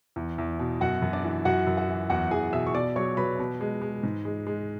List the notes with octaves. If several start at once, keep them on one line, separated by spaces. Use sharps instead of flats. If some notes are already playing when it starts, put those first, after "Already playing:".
E2
E2
B2
F#2 F#4 F#5
F#2
D4 D5
E3
F#2 F#4 F#5
F#2
F#4 F#5
E3
E2 F#4 F#5
E2 G#4 G#5
B2 E5 E6
C#6
B2 D5 D6
F#3 C#5 C#6
F#3 B4 B5
B2
G#3
G#3
G#2
G#3
G#3